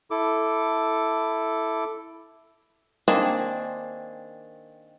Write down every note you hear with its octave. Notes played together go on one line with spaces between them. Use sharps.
E4 A4 D6
D#3 A#3 C4 D4 G#4